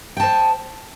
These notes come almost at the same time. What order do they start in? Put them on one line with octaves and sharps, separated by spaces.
G5 A5 C5